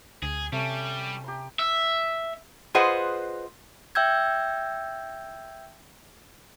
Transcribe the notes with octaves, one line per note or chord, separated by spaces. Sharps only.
D2 G#4
C3 G3 A3 C#4
G4 A#5 C6
E5
F4 G#4 B4 C5 D#5 F#5
E5 G5 E6 G6 G#6